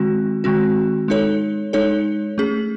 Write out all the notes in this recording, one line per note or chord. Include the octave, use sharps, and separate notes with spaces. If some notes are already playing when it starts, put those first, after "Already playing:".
Already playing: D#3 G#3 C4 F#4
D#3 G#3 C4 F#4
G#3 D#4 A4 C#5
G#3 D#4 A4 C#5
A3 C#4 G#4